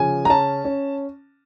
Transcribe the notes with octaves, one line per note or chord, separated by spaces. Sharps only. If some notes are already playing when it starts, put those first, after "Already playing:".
Already playing: C#3 F3 G#5
A#5
C#4 A5
C#4